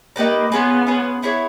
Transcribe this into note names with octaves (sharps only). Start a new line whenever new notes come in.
A#3 D#4 G4 B4 D5
B3 C#4 F4 G#4 B4
C#4 F4 G#4 B4
B3 E4 G#4 C#5